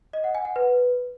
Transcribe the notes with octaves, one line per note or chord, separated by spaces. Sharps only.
D#5
F#5
G#5
F#5
B4